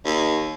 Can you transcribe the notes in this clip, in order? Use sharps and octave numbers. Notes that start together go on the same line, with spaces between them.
D#2